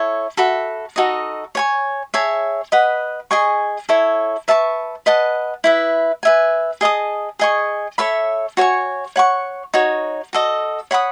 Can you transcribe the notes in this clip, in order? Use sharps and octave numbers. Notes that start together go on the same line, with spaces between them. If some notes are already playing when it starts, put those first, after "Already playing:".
Already playing: E4 A4 C#5
F#4 A4 E5 B5
D#4 F#4 A4 D#5
C#5 G#5 C#6
G#4 C#5 E5 A5
B4 D#5 F#5 B5
G#4 D#5 G#5 C#6
E4 A4 C#5
B4 E5 A5 C#6
B4 D#5 F#5 A5
E4 B4 E5
B4 E5 G#5
G#4 D#5 A5 D#6
G#4 D#5 G#5 C#6
A4 C#5 E5 B5
F#4 C#5 G#5 C#6
C#5 F#5 C#6
D#4 F#4 C#5
F#4 A4 D#5
C#5 F#5 B5 D#6